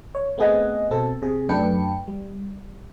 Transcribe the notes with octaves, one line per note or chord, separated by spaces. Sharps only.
C#5
A3 B3 C4 G#4 D#5 F#5
B2 C4 A4 A5
C3 G#4
F#2 A3 D4 B4 G5 C#7
G3